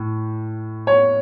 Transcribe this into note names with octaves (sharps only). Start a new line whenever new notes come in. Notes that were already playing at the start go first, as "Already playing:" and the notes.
Already playing: A2
C#5